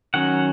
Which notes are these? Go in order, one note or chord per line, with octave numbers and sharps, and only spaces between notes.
D#3 F#3 C#4 F#5